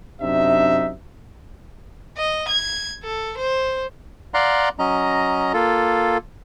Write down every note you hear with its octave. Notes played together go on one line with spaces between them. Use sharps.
F#2 C3 D4 D#4 E5
D#5
G#6
A4
C5
D5 F5 F#5 A#5 C6
F#3 C#4 D#5 A#5
A#3 F4 A4